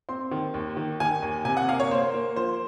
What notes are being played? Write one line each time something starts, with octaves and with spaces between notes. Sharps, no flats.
C4 C6
D#3
D#2
D#3
D#3 G#5
D#2
C3 G#5
F#5
A#3 F5
C#5
A#3 C5
A#3
F3 C5